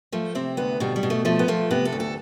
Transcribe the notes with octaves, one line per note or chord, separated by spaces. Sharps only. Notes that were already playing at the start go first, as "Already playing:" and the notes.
F3 A3
C3 C4
D2 B3
B2 G3
G3
B2
A3
F3 A3
B3
F3 A3
C3 B3
A4
D2
A4